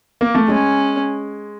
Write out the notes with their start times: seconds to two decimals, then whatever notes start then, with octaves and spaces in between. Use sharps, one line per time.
0.21 A#3
0.35 A3
0.48 G#3 C#4